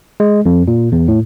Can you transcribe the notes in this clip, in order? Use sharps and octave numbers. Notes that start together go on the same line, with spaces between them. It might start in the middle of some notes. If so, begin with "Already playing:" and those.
G#3
F2
A#2
E2
A2